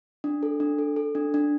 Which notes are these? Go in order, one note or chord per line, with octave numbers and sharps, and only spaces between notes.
D4
A4
D4
A4
A4
D4
D4